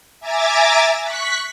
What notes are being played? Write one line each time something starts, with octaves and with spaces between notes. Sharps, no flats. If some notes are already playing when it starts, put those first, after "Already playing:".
E5 G#5 A#5 D6 A6
C#6 F#6 B6